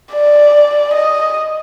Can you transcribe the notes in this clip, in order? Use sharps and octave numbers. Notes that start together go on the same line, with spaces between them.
D5
D#5